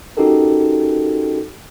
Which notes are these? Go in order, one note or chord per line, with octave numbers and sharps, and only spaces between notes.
C#4 D#4 F#4 G4 A4 A#4